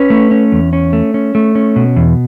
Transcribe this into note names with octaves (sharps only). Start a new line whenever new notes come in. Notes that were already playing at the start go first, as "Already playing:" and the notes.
Already playing: C#4 B4
A3
C#4
E2
C#4
A3
C#4
A3
C#4
B2
E2